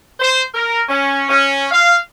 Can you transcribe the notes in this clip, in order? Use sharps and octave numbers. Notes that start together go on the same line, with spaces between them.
C5
A#4
C#4
C#4
F5